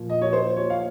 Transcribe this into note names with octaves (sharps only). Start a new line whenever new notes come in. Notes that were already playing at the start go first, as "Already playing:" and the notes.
Already playing: A#2 F3
D#5
C#5
C5
C#5
F5